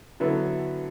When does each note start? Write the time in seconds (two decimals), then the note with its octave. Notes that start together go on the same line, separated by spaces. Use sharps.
0.20 D3 F#3 B3 E4 A4